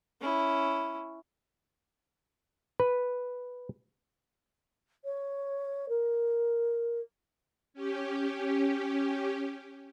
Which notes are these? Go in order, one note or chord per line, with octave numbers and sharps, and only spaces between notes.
C#4 E4
B4
C#5
A#4
C#4 G4